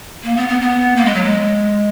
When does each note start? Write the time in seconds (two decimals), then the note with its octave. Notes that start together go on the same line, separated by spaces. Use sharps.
0.24 A#3
0.36 B3
0.48 B3
0.60 B3
0.96 A#3
1.05 G#3
1.14 F#3
1.24 G#3